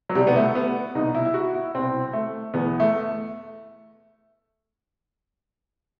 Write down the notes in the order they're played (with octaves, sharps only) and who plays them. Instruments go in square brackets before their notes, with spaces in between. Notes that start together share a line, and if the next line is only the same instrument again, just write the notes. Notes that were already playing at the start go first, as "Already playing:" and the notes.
[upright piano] F#3
C2 B2 G3
B3
A3
B3
C2 B2 D#4
E4
E4
F#4
E4
C2 B2 C4
A3
E2 B2 B3
A3